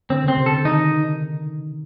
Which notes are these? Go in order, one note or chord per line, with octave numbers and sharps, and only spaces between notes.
D3 C4
C#3 C4
C3
A4
D3
D#3 D#4